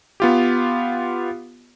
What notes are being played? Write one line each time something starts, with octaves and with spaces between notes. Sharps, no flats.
B3 F4 G4